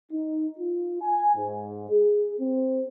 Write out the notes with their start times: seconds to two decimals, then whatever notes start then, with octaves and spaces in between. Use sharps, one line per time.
0.12 D#4
0.59 F4
1.02 G#5
1.36 G#2
1.90 G#4
2.40 C4